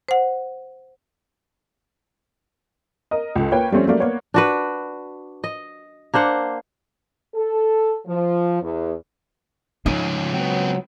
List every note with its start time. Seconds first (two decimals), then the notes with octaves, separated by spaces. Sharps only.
0.08 C5 F#5
3.11 A#4 D#5
3.36 C#2 A4
3.52 A#3 B4 C#5 G5
3.71 F3 G3 A3 C4 C#4
3.87 F#3 G3 A3 A#3 D5
4.00 A#3 B3 C#5 D5
4.34 D4 F#4 B4
5.44 D#5
6.14 A#3 D4 C5 F#5
7.34 A4
8.07 F3
8.61 E2
9.86 C#2 F3 C#4 D#4
10.34 F#3 B3 C4